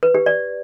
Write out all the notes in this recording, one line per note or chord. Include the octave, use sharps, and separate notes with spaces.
B4
G4
D5